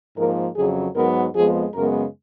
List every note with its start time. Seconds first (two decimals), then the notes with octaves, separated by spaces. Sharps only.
0.17 G#2 F3 A#3 A#4
0.56 F2 C#3 F#3 G#4
0.95 G#2 F#3 B3 A#4
1.35 F2 F3 G#3 B3 G#4
1.74 F#2 C#3 G#3 B3 A#4